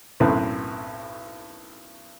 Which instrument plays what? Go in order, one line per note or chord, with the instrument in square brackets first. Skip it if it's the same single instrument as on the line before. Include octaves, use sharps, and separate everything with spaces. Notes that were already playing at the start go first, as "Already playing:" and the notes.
[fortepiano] B1 F#2 A2 C4 B4